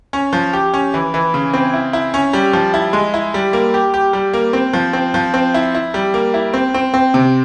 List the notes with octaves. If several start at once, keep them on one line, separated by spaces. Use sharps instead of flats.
C#4
F3
G4
C#4
E3
E3
C#3
C4
E4
E4
C#4
G3
F3
E4
G#3
E4
G3
A#3
G4
G4
G3
A#3
C4
F3
C4
F3
C4
E4
E4
G3
A#3
E4
C4
C4
C4
C3